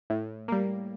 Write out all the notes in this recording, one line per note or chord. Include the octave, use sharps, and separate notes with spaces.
A2
G3 A#3